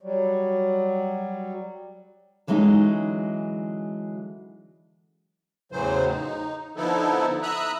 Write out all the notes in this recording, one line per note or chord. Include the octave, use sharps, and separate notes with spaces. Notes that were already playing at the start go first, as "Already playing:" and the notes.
F#3 G3
D3 E3 F#3 G#3 C#4 D#4
E2 A2 C#3 E3 F#3 C5
D#4
D3 F3 B3 D#4 E4 A4
E5 A#5 B5 D#6 E6 F#6